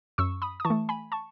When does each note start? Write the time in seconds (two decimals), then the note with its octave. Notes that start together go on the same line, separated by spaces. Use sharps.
0.18 F#2 C#6 E6
0.42 B5 D#6
0.60 D#6
0.65 E3 A5 C#6
0.70 A3
0.89 G#5 B5
1.12 A5 C#6